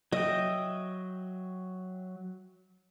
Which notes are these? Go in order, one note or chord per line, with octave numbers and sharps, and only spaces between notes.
F#3 D#5 E5 G5